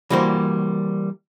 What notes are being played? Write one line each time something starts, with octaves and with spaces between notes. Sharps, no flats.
E3 G3 A#3 F#4 C5